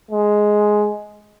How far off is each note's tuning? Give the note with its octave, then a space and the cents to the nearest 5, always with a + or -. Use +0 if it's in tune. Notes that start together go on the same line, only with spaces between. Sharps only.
G#3 +5